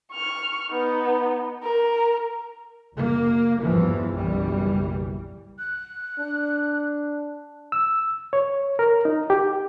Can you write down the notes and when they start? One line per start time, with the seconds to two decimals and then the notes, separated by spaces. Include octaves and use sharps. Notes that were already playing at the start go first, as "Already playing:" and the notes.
0.12 C#6 F6
0.70 B3 D#4
1.63 A#4
2.92 F#1 A#3
3.61 G#1 E2 G2 E3 F3
4.12 F#1 B1 F#2 E3 G3
5.59 F#6
6.20 D4
7.72 E6
8.33 C#5
8.79 A#4
9.05 D#4
9.30 G4